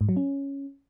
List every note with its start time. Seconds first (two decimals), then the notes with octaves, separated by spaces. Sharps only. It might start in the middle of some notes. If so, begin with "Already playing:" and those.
0.01 G#2
0.09 F#3
0.17 C#4